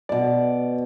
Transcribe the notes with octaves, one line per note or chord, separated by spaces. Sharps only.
B2 D5 D6